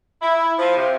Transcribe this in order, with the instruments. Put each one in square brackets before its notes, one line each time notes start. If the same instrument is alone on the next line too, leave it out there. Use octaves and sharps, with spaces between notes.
[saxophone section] E4
F3
C3